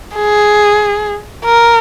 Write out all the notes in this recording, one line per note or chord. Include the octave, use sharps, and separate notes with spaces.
G#4
A#4